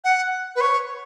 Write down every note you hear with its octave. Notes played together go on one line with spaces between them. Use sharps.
F#5
B4
C#5